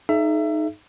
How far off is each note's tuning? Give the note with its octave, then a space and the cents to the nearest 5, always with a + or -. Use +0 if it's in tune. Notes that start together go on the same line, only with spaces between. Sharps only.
D#4 -5 G#4 +45 E5 +25